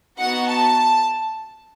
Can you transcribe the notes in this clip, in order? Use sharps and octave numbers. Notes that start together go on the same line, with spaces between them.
B3 D#4 F#4 F#5
A5